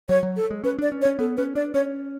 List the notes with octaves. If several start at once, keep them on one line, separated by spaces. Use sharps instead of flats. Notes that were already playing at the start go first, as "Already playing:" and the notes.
F#3 C#5
F#3
A4
G#3
C#4 B4
D4 D5
C#4
C#5
C#4
B3 A4
C#4 B4
D4 D5
C#4 C#5